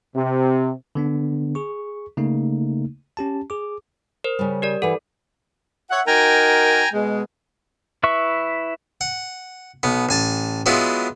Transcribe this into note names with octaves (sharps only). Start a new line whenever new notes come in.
C3
D3 B3 D4
G#4 C#6
C#3 A3 A#3 D#4
C#4 G4 A5
G#4 D6
A#4 C5
C#3 G3
G4 A#4 D5
E3 A4 B4 F#5
C#5 E5 F#5
D#4 F#4 A#4 G5 G#5 A#5
B2 G#3
E4 B4 E5 C#6
F#5
B1 B3
A1 G#5 A5
F#3 G#3 B3 E4 F4